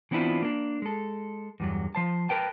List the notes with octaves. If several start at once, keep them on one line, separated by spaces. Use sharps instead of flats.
E3 B3 C4 D4 E4 F4
A#3 D4
G#3 A4
E2 G2 F#3
F3 C5 A5
A#4 B4 G5 A5